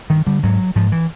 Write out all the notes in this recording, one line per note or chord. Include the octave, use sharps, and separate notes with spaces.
G2 D#3
D3 G3
G#2 F#3
G#2 F3
E3